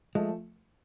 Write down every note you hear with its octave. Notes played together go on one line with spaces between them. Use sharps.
F3 G#3 A3